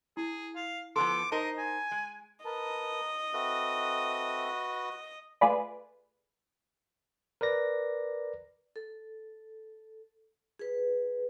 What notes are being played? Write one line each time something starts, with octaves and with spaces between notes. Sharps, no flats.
E4 G#4
F5
F3 B3 A4 C6 D6
D#4 A#4 C5 D#5 A5
G#5
G#3
A#4 B4 D#5 A5
C4 F#4 A4 B4 E5
A3 F4 G#4 B4 D5
A#4 B4 D5 A#6
A4
G#4 B4